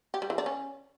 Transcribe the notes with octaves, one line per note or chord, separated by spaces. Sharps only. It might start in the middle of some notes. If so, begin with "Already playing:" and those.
G4
G3
E3
D4
C#4